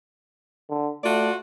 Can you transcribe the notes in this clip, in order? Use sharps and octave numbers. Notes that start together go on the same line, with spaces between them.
D3
A3 F4 F#4 D5